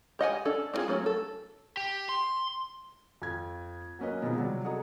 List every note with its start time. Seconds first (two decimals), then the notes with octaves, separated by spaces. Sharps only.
0.19 G4 D#5 F#5 G#5
0.45 C#4 D4 A4
0.74 C4 D4 D#4 F4 G#4
0.88 F#3 A3 C#4 F#4
1.06 A4
1.77 G4
2.09 C6
3.22 F2 G#6
3.99 F#3 A#3 C#4 B4 D#5
4.22 B2 F3 C4 D#4 G#4
4.36 C3 F#3 G3
4.64 F#4 G#4 A4 D#5 A#5 D#6